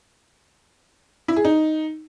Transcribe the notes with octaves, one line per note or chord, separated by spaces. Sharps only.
E4
G#4
D#4